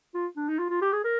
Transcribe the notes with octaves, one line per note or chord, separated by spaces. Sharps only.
F4
D4
D#4
F4
F4
G4
G#4
A#4